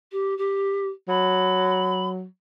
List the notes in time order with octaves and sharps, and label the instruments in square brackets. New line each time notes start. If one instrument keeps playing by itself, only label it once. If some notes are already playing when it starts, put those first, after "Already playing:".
[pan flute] G4
G4
[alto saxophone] F#3 [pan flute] B5